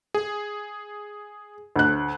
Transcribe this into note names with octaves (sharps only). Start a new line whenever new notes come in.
G#4
D2 F#6